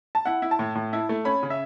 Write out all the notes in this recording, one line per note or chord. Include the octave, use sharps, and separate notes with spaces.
A5
E4 F#5
E4
A5
A2
A2
E4
A3
C#4 B5
C#3
E5